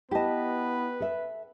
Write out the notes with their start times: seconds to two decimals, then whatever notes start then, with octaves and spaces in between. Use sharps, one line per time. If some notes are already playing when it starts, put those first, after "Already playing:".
0.11 B3 E4 G4 B4 D#5 A5
1.00 A4 E5